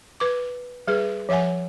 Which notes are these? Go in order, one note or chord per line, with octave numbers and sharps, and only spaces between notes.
B4 D6
G3 G#4 B4
F3 C#5 E5 F#5 G#5